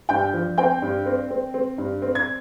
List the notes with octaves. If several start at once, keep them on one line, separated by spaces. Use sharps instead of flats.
G2 G5 G6
F3
C4 G5 G6
G2
C4
C4
C4
G2
C4
G#6